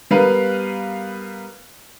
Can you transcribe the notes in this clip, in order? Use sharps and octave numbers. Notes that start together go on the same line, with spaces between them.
G3 B3 A#4 B4 F5